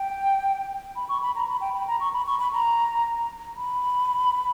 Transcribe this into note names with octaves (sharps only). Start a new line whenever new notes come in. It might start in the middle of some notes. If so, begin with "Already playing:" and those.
Already playing: G5
B5
C#6
B5
A#5
B5
G5
B5
A#5
C#6
B5
C#6
B5
A#5
B5